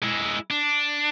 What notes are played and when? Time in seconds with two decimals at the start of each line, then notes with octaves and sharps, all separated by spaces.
0.03 G#3 E4
0.50 D4